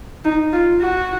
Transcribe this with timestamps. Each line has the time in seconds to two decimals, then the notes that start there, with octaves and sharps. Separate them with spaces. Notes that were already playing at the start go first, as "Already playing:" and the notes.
0.25 D#4
0.53 F4
0.81 F#4